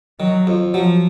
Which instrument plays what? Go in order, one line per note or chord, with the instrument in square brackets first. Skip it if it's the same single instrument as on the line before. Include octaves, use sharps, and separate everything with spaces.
[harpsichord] D#3 [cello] F#3
[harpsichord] F2
[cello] F3 [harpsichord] F#3